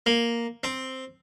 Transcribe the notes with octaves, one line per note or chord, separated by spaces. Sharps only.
A#3
C4